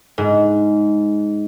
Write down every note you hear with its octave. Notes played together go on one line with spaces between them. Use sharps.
G#2